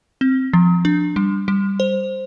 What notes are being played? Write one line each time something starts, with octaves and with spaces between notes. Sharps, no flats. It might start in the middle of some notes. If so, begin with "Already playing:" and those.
C4
F3
D4
G3
G3
C5